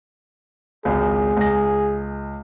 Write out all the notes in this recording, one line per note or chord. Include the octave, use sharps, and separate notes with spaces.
G#1 C#2 G#4
C#2 A#6